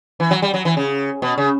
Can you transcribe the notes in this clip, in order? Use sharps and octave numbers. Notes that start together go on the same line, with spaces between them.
E3
F#3
G3
F#3
E3
C#3
B2
C#3